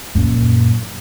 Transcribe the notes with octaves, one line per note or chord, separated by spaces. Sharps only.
F#2 A#2